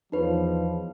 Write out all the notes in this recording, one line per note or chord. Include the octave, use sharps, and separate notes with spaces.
E2 F3 D#4 B4 C#5